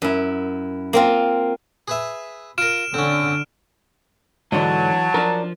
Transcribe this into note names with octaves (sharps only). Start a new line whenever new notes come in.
F#2 E4
A#3 C4 F4
G#4 B4 E5
F4 A#4 F6 D7 E7
D3 C4 C#4
G#2 D3 E3 F#3 A5
F3 D4 A#4